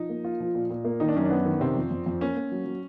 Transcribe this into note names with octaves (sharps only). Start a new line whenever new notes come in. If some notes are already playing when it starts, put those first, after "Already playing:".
Already playing: F3 D#4
A#3
F4
F3
A#2
A#2
A#3
D#3 D#4
D4
F#2 C#4
D4
B3
D#3
C3 C4
F2
F2
F2
A#3 C#4
A#3
F#3
F#3